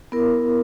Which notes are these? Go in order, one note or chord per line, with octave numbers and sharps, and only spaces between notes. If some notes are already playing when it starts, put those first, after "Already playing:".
B3 E4 A#4